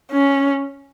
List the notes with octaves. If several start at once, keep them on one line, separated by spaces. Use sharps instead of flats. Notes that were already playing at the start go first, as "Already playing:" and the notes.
C#4